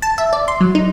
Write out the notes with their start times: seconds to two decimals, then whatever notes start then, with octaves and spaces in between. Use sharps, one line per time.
0.02 A5
0.18 E5
0.33 D5
0.48 C6
0.61 F#3
0.75 D#4